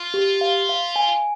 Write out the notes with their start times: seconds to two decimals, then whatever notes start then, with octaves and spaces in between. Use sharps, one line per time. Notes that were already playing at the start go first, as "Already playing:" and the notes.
Already playing: F4
0.14 G4
0.41 F5
0.69 F5
0.96 G#5